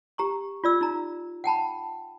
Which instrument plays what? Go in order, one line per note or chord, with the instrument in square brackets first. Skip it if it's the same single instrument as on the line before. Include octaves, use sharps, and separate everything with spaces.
[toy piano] G4 A#5 C#6
F4 D5 E6
D#4 A#5
F#5 G5 A5 B5